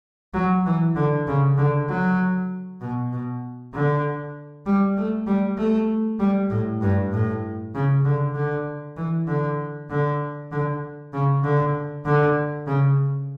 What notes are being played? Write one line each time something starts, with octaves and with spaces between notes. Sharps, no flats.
F#3
E3
D3
C#3
D3
F#3
B2
B2
D3
G3
A3
G3
A3
G3
A2
G2
A2
C#3
D3
D3
E3
D3
D3
D3
C#3
D3
D3
C#3